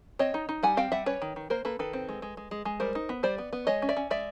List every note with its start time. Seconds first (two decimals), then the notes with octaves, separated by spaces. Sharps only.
0.19 C4 C#5 D#5
0.34 D#4
0.49 D#4
0.63 G3 F#5 G#5
0.77 C4 F5 G5
0.92 G3 E5 F#5
1.06 C#4 B4 C#5
1.22 D#3
1.36 D#3
1.50 A#3 A#4 C5
1.65 A#3 A4 B4
1.79 D#3 A4 B4
1.93 C4
2.09 G#3
2.22 G#3
2.37 G#3
2.51 G#3
2.65 G#3
2.80 G3 A#4 C5
2.95 D#4
3.09 B3
3.23 G3 C5 D5
3.38 B3
3.53 B3
3.67 G#3 C#5 D#5
3.82 C#4
3.89 D5 E5
3.97 C#4
4.10 G#3 D5 E5